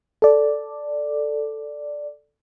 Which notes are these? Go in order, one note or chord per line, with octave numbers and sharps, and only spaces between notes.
A4 D5